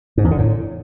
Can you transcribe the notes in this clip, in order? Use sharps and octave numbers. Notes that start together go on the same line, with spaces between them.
G#2
E2
D3
A2